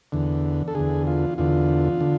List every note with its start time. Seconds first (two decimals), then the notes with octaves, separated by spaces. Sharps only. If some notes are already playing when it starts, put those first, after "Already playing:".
0.12 E2 D3
0.68 A4
0.75 E2 D3 G#4
1.07 F4
1.38 E2 D3 F4
2.01 D3